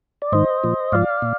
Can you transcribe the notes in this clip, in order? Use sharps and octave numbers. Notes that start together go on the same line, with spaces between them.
D5
G#2 D#3 C5 D#5
A#2 F3
G#2 F3 D5 F5
A#2